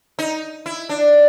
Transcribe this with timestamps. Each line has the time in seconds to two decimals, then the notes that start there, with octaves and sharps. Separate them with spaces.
0.19 D#4
0.66 E4
0.89 D4